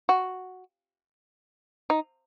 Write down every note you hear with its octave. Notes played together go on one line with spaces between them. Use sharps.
F#4
D#4